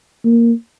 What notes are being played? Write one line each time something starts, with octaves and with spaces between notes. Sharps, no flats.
A#3